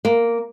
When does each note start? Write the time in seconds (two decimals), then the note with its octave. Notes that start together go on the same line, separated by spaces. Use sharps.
0.05 A#3